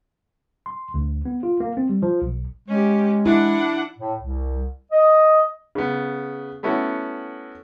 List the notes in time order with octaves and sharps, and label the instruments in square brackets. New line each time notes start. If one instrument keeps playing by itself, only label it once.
[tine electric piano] C6
D2
B3
F4
A#3
C4
G3
F3
B1
[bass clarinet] G#3 [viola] C#4 G4
[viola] D4 F#5 [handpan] E4
[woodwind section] A2
C2
D#5
[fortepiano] C#3 B3
A3 B3 C#4 E4 F#4